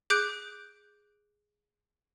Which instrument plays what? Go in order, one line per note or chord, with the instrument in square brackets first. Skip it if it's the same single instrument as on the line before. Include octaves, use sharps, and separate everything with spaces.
[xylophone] G#4 D6 F#6 G6 D7